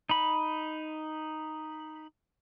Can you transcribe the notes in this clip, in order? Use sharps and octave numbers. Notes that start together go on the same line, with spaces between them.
D#4 B5